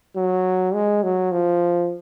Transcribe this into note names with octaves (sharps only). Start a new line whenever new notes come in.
F#3
G#3
F#3
F3